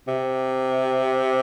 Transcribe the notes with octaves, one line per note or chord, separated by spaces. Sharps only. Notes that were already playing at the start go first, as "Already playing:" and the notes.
C3